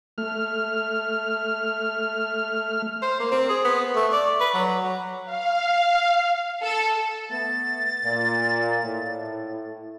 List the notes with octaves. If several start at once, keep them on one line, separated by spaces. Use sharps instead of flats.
A3 F6
C5
A#3
C4
G#4
B3
A3
D5
B4
F#3
F#3
F5
A4
A3 B3 A6
A#2
A2